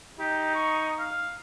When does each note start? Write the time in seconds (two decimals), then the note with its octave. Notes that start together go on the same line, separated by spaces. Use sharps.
0.20 D#4 G4
0.55 C#6
0.99 F5